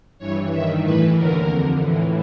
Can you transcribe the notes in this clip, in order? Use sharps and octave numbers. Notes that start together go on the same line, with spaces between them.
G2 E3 C#5
G2 D#3 E5
A2 E3 B4
D#2 D3 A#4
F2 D3
A2 E3